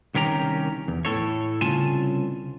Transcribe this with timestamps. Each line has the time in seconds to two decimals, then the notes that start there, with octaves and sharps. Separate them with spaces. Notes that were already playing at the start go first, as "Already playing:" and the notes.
0.15 C2 D#3 C#4 G4 A#5
0.88 E2
1.05 A2 A4 C#5
1.61 C2 C#3 F4 G#5 A5